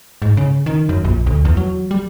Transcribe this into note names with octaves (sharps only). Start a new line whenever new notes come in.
G#2
C#3
D#3
F#2
A#1
D2
E2
F#3
G3